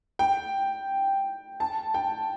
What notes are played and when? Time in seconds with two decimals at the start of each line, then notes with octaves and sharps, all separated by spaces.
0.19 G5
1.60 A5
1.94 G5